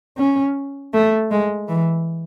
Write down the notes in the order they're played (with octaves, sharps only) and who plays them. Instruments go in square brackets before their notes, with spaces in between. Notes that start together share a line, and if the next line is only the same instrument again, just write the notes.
[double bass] C#4
A3
G#3
E3